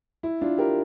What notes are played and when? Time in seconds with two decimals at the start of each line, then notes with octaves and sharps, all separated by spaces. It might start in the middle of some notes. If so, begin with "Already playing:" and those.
0.23 E4
0.41 D4 F4
0.58 G4 A#4